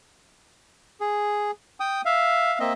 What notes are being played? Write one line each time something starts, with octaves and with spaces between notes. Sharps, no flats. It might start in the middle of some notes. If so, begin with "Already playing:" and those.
G#4
G5 D#6
E5 F5
A#3 C4 D#5 E5